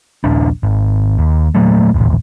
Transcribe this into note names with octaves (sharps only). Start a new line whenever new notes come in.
D#1 A#1 D4
G#1
D#2
A#2 F#3 A3
D#1 A1 E2